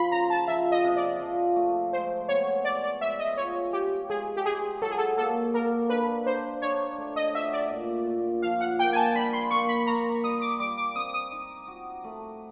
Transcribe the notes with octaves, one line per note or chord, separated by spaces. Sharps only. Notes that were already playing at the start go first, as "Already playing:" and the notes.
Already playing: F3 B5 C6
C#3 A#5
A5
F3 E5
D#5
C3
D5
F3
A3
G#3 C5
B3 C#5
G#3 D5
D5
G#3 E5
D#5
F4 C#5
G#3 G4
G#3 G#4
G4
G#3 G#4
F#3 A4
G#4
A4
A#3 A4
A#3 A#4
D4 B4
D4 C5
D4 C#5
A3
D#5
F#4 E5
D5
A#2
A#2
F3 F5
F#5
A#3 G5
G#5
A5
G3 B5
C6
A#3 C#6
B5
A#3 A#5
G3 D#6
D6
G3 D6
D6
C4 D#6
D#6
D#4
F#4
A3